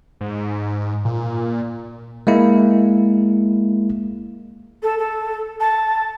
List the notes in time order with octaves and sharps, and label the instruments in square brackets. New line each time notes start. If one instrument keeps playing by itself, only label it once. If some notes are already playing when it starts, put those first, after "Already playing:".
[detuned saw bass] G#2
A#2
[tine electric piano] G#3 A#3 E4
[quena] A4
A4
A5